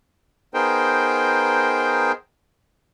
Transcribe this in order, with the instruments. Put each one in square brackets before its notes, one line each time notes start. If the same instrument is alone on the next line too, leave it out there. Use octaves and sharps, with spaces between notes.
[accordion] B3 D#4 G#4 A#4 C5 G5